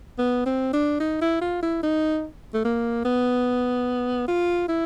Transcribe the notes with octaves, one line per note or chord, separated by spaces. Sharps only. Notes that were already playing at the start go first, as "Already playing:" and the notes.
B3
C4
D4
D#4
E4
F4
E4
D#4
A3
A#3
B3
F4
E4